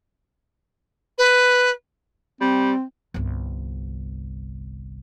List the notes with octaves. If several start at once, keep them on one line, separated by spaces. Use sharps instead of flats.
B4
G3 C4
G1 C2